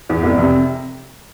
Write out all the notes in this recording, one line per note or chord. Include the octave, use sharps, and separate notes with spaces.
E2
F1
C3